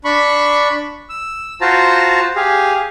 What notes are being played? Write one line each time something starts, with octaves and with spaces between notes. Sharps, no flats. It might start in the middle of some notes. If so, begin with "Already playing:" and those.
D4 B5 C#6
E6
F4 F#4 C5 A5 A#5
G4 G#4 F5